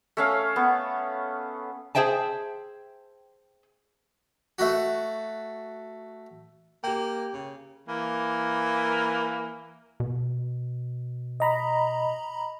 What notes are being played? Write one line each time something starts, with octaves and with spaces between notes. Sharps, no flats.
A3 C#4 F5
B3
G#4 C5 E5 G5 A5
A3 F#4
A#3 G4 G5
C#3
E3 A#3
B2
D#5 A#5 B5